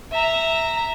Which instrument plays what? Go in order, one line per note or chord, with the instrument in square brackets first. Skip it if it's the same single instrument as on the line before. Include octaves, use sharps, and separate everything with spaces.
[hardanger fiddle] E5 A#5